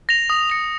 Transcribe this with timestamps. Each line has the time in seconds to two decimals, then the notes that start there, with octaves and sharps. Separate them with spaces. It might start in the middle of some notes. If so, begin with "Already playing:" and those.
0.09 A#6 F7
0.30 D#6
0.50 A#6 C#7 F7